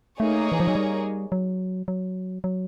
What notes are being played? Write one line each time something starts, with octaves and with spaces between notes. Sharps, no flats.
A3 A#3 D#4 G#4 C#5
E3
F3
F#3
G3
F#3
F#3
F#3